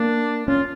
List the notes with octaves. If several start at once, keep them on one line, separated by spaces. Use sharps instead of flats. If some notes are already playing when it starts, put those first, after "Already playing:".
Already playing: A#3 D4
C#4 F4